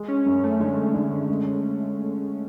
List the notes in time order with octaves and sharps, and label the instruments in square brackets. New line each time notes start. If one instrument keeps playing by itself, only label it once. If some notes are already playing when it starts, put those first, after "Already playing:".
Already playing: [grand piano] G#3
[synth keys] C#4
[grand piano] F#2
[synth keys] A3
[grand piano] D3 [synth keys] G#3
[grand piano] D3
G#3